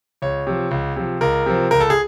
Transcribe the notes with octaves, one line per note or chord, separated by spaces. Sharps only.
C#2 C#5
C3 F3
C#2
C3 F3
C#2 A#4
C3 F3
C#2 A#4
A4
G#4